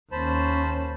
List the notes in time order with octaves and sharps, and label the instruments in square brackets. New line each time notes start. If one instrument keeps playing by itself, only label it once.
[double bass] D#2 C#4 [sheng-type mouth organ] C5 A5 B5